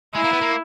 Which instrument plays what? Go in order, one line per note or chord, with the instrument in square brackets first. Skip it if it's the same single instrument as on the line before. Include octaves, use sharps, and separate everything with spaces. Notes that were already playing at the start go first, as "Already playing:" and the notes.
[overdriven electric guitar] G#3 [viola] E4
[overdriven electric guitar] A#3
B3
A#3